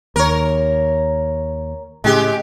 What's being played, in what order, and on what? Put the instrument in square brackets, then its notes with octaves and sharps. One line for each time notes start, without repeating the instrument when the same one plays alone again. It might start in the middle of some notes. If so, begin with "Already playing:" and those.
[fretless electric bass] D#2 [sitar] A#4 C#5
[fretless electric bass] A2 C#3 [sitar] G#3 G4